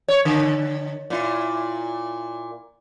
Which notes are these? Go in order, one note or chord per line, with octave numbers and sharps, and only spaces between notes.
C#5
D3
A#2 E4